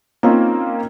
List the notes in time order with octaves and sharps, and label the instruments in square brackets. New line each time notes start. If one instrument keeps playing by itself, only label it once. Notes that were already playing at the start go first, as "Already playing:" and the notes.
[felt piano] A#3 C4 C#4 D#4 F4